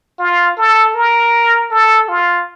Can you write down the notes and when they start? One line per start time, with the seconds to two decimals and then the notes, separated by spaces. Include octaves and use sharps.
0.19 F4
0.57 A4
0.95 A#4
1.71 A4
2.09 F4